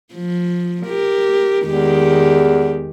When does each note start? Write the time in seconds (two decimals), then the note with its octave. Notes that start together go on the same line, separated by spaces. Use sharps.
0.14 F3
0.85 G4 A#4
1.66 E2 D#3 G#3 G4